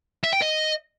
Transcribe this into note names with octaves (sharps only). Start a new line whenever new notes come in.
E5
G5
D#5